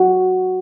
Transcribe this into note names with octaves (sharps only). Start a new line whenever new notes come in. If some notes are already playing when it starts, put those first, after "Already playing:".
Already playing: F#4